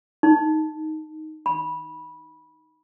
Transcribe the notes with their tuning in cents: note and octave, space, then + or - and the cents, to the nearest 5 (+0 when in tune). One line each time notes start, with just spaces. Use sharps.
D#4 +5
B5 -15